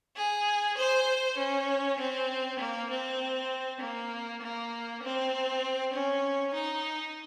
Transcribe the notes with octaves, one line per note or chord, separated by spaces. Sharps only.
G#4
C5
C#4
C4
A#3
C4
A#3
A#3
C4
C#4
D#4